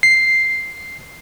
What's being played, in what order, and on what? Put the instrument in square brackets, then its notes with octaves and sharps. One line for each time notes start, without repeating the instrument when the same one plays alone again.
[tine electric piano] C7